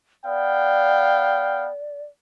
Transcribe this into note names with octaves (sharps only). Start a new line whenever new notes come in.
B3 D5 F5 G5